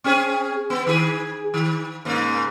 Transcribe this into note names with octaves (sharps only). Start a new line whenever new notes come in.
C4 C#4 G#4
B3
D#3 G#4
D#3
G#2 C#3 A#3